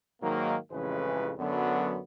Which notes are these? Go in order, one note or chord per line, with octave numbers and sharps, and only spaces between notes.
G#2 D#3 F#3 A#3
A1 F2 C#3 E3 G#3 B4
F#2 D3 F#3 B3